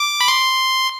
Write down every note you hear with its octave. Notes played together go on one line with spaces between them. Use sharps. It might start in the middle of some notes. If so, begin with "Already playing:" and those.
Already playing: D6
B5
C6